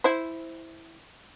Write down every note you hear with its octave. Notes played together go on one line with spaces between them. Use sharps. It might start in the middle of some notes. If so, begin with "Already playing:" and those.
E4 C5